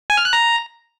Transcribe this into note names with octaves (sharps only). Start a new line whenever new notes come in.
G#5
F6
F#6
A#5